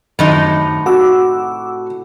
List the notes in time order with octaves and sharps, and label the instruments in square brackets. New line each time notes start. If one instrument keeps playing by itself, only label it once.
[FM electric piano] F#2 D#3 F#3 [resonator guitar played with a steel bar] A2 C3 D#4
[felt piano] F#4 [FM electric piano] F#5 D6 E6